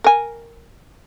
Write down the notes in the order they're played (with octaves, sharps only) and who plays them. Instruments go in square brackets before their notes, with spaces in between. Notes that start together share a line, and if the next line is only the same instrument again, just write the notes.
[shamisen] A#4 G#5